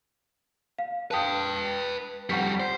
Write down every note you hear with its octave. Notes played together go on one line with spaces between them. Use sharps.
F5
B4 G5 A5 D#6
F2 G3 F#5 C#6 B6
C5